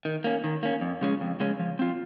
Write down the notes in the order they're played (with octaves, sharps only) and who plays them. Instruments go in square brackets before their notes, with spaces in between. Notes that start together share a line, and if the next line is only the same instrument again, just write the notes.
[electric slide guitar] D#3
A#3 C#4
D#3
A#3 C#4
F2
C#3 G#3 C#4
F2
C#3 G#3 C#4
F3
C4 F4